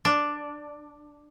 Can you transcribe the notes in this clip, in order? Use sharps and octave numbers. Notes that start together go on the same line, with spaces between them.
D4